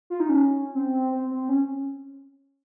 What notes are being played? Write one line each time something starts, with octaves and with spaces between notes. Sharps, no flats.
F4
D#4
C#4
C4
C4
C4
C#4